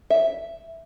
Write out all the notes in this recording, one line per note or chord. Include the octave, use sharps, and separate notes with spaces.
E5